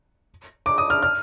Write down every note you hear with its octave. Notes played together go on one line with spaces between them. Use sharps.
D6
D#6
F6
F6